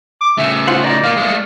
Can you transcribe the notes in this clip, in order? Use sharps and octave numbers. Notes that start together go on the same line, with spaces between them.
D6
C#3 A3 E5
F4 C5 F#5
D#4 D5 D6
A#3 F4 F5
G#3 A3